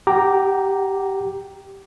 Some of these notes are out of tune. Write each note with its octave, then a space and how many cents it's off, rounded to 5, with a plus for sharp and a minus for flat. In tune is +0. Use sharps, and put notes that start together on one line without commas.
G4 -5 F#5 +20 A#5 +0